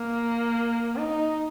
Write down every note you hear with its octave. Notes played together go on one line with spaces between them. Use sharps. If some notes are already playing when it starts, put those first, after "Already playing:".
Already playing: A#3
D#4